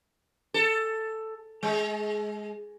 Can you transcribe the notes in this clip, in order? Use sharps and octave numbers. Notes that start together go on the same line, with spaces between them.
A4
G#3